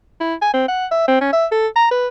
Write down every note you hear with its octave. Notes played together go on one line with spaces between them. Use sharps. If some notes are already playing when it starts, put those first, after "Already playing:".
E4
G#5
C4
F#5
E5
C4
C#4
E5
A4
A#5
B4